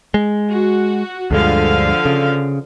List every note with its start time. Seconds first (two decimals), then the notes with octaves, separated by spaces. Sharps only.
0.14 G#3
0.49 F#4
1.31 D2 G2 D3 F3 G#3 F5
2.06 C#3